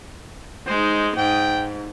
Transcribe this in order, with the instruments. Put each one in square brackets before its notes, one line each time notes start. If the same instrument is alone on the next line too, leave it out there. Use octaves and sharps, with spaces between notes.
[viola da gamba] G#3 D#4 [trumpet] C5
[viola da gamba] G#2 [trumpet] G5